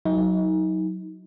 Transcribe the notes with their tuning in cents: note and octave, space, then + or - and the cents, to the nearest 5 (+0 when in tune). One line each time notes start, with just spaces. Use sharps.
F#3 +0 D#4 +30